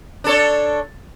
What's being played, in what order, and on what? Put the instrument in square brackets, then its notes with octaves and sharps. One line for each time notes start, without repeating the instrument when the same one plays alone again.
[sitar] D4 A4 C#5